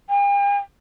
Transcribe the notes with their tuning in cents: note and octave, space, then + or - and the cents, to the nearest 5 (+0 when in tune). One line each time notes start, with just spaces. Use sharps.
G5 +45